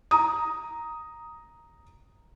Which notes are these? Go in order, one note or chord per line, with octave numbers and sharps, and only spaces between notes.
A#5 D#6